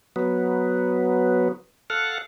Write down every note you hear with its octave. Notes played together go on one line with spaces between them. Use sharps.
F#3 B3
A4 F5 F#5